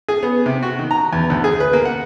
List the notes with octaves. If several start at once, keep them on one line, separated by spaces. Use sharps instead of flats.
G#4
B3
C3
F#4
D#3
A#5
E2
D2
G#4
B4
A#3
F#5